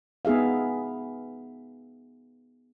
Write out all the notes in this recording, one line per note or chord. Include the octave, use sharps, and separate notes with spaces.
B3 D#4 G#4 E5 F5